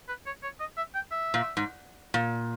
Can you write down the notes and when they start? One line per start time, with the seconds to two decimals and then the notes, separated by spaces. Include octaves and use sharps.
0.08 B4
0.26 C#5
0.43 C#5
0.60 D#5
0.77 E5
0.95 G5
1.11 E5
1.34 A#2
1.57 G#2
2.14 A#2